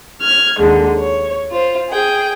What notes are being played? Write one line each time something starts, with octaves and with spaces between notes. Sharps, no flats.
F6 G#6
D#2 D3 G#3
C#5
F4 C5
G#4 G5